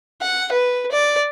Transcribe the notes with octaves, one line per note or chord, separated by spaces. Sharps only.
F#5
B4
D5